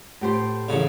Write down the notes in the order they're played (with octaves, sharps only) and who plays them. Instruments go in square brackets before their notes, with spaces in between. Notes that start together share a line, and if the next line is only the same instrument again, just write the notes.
[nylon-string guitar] A2 G4 C5
[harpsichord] A1 C#3